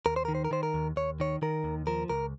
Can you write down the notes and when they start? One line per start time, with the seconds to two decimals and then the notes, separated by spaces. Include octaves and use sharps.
0.06 D#2 A#4
0.16 C5
0.25 D#3 A#4
0.35 C5
0.45 A#4
0.51 D#3 C5
0.63 A#4
0.74 D#2
0.96 D#2 C#5
1.20 D#3 C#5
1.42 D#3 A#4
1.64 D#2
1.87 F3 A#4
2.10 C#2 A#4